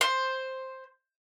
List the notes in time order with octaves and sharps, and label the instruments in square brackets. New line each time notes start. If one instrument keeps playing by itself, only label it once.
[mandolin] C5